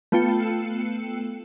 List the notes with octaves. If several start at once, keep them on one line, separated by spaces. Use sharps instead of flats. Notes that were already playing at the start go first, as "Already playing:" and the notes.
A3 B3 F4 A4 G5 C#7